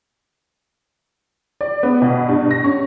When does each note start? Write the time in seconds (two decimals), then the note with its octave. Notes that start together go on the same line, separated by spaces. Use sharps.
1.61 D5
1.83 B3
2.02 B2
2.29 G2
2.51 A#6
2.64 C#4